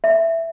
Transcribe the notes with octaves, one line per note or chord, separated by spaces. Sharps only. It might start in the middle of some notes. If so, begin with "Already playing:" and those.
E5